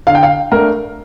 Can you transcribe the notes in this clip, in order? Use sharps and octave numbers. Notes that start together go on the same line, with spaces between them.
D3 F5
G5
F5
A3 D4 A#4